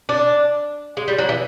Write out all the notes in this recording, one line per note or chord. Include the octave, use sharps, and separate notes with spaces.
D4
G#3
G3
F#3
E3